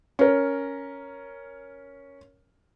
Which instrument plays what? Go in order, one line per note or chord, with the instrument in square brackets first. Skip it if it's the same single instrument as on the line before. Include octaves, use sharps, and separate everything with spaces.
[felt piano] C#4 A#4